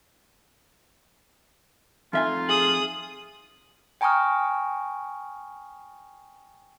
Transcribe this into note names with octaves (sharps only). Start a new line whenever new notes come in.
F2 A3 D#4 F4 E5 G#5
G#4 D#6 F#7
G5 G#5 A#5 C#6 D#6 F6